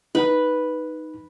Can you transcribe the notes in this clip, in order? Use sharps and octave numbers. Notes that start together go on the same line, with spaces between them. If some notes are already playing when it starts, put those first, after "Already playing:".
D#4 B4